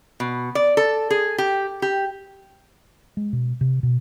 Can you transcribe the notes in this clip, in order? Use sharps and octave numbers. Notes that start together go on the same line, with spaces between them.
B2
D5
A4
G#4
G4
G4
G#3
B2
C3
B2